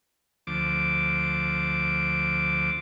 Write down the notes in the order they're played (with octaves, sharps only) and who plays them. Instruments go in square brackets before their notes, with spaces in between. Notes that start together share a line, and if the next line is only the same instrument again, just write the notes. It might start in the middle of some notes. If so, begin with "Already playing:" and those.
[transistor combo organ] D2 F3 D6